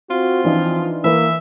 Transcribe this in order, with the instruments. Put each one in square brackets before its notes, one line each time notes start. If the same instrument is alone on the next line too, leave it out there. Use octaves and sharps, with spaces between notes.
[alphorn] C4 [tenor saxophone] F4 [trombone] F#4
[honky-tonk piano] E3 D4 D#4 [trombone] F3
[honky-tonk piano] E3 B4 [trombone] A#3 [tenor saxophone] E5